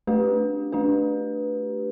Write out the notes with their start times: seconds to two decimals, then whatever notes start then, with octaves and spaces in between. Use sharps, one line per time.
0.07 A3 D4 G4 B4
0.72 A3 D4 G4 B4